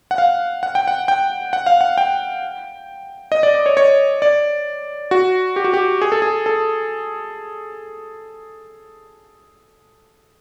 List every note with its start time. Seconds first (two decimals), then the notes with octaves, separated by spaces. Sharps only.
0.11 F#5
0.18 F5
0.63 F#5
0.75 G5
0.88 F#5
1.08 G5
1.53 F#5
1.66 F5
1.81 F#5
1.98 G5
3.32 D#5
3.43 D5
3.55 D5
3.66 C#5
3.77 C#5
4.22 D5
5.11 F#4
5.56 G4
5.64 F#4
5.73 G4
6.02 G#4
6.12 A4
6.22 G#4
6.46 A4